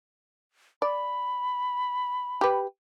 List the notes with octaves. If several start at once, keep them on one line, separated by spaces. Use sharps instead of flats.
D5 B5
G4 B4